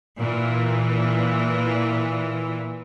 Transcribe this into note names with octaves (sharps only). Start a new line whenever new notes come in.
A#2 E3